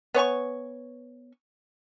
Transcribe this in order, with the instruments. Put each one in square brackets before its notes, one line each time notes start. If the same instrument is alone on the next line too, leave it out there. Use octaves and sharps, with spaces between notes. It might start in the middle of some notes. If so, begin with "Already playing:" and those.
[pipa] B3 C#5 G#5 C#6